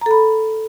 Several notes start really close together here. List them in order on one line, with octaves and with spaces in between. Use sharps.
A#5 A4 B5